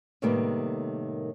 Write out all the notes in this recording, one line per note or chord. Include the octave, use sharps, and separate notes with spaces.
A2 C3 D#3 G3 A#3 B3